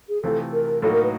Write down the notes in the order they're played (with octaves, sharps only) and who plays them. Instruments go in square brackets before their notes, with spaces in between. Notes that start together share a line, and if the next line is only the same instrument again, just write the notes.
[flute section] G#4
[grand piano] C3 E3 A3 C4 F4 [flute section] A4
[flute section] A#4
[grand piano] A2 F#3 A#3 D#4 F#4 [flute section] A4
[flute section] A#4
B4